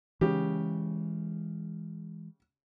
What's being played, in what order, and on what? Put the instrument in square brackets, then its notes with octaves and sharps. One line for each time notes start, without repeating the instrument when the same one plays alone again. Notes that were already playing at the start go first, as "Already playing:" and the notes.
[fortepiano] C#3 G4 [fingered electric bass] E3 G#3